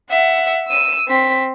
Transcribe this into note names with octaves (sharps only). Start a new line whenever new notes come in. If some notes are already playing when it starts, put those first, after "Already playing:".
E5 F#5
E6 D#7
C4 B6